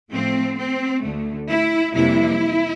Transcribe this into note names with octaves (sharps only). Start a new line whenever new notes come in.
A2 F3 A3 C4
C4
D2 D3 A3
E4
F2 C3 E3 G3 A#3 E4